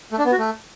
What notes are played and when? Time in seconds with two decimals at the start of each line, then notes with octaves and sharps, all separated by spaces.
0.12 A3
0.18 D4
0.25 B3
0.32 F#4
0.38 A3